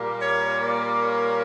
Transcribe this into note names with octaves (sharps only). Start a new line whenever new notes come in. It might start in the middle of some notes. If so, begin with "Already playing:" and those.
Already playing: A#2 G3 A#3
C#5
D5
C#5